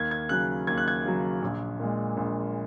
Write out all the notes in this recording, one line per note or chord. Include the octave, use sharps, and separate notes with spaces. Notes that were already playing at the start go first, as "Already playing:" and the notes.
Already playing: D#2 G#6
G#6
C#3 F#3 F#6
D#2 G#6
F#6
G#6
C#3 F#3
A#1
A#2 G#3
A#1